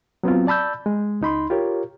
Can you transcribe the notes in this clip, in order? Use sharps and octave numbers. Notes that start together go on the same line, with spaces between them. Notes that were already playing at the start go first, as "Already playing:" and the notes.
F#3 B3 C4 F4
D5 A5 B5 E6 G6
G#3
C#2 D#4 B5 C6
F4 G4 A#4 C#5